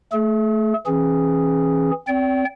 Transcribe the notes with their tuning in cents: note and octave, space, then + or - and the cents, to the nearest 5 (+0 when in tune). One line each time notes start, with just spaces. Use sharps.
A3 +0 G#4 +45
E3 +0 C#4 -35 G#4 +0
C4 +0 D5 -40 G5 -25